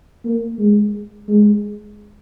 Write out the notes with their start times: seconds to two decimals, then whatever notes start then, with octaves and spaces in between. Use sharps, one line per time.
0.25 A#3
0.58 G#3
1.28 G#3